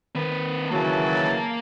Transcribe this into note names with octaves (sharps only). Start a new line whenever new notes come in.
D#3 C4 B4
C#3 E3 F#3 A#3 A#4 A5